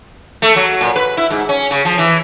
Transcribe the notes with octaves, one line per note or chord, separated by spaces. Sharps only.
A3
F#3
A#2
B4
E4
G#2
C#4
C#3
F3
E3